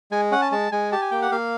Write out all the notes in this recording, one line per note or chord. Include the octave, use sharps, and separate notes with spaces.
G#3 G#5
C#4 F#5
A5
G#3 A5
G#3 G#5
G4 A5
G#5
A#3 G5
F#5
A#3 F5